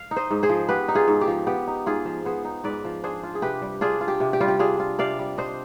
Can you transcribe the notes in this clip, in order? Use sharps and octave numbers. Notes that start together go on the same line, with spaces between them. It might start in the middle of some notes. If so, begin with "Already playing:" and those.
Already playing: F5
D#4
C5 D#5
G#2
G#4 C5
F3
B3 G4 B4
D#4
F4 G#4
G#2
G4
F3
B3 G4
D#4
G#2 F4 G#4
F3
B3 G#4 C5
D#4
G#2 B4 D5
F3
D4 G#4 C5
F4
G#4
C3 G4 B4
G3
D4 F4 G#4
F4
G4
C3
G4
G3 F4
G4
D4 F4 G#4
F4
C3 D5 F5
G3
D4 C5 D#5